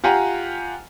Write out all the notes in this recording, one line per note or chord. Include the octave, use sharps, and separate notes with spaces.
F4 G4 F#5 G#5 A#5